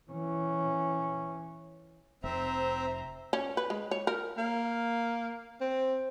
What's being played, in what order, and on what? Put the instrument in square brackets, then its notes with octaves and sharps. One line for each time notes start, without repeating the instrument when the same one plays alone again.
[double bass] E3 C#4
[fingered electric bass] F1 [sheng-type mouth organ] C4 E5 [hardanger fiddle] C5 A#5
[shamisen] C#4
B4
G#3
C#5
A#4
[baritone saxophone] A#3
C4